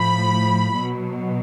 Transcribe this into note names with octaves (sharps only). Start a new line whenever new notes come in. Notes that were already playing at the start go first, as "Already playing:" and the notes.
Already playing: A2 F3 B5
B2 F#3